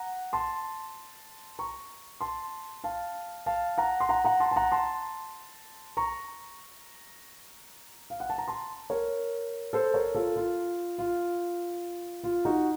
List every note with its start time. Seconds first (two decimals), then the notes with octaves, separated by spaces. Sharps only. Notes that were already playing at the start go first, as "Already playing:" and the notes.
Already playing: F#5 A#5
0.33 A5 C6
1.59 A#5 C#6
2.21 A5 C6
2.84 F5 A5
3.46 F5 A5
3.78 F#5 A#5
4.00 C6
4.09 F#5 A#5
4.25 F#5 A#5
4.40 A5 C6
4.51 A5
4.56 F#5 A#5
4.72 A5 C6
5.97 A#5 C#6
8.10 F5
8.20 F#5
8.30 A5
8.38 A#5
8.48 A5 C6
8.90 A#4 C#5
9.73 A4 C5
9.94 A#4 C#5
10.15 F4 A4
10.36 F4
10.98 F4
12.24 F4
12.45 D#4 F#4